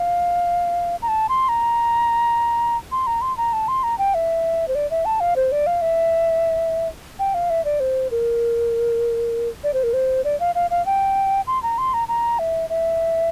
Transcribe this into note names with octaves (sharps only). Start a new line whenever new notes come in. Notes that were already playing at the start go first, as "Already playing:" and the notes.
Already playing: F5
A#5
A5
C6
A#5
C6
A#5
C6
A#5
A5
C6
A#5
G5
E5
C5
D5
E5
A5
F5
C5
D5
F5
E5
G5
F5
E5
D5
C5
A#4
D5
C5
A#4
C5
D5
F5
F5
F5
G5
C6
A#5
C6
A#5
A#5
E5
E5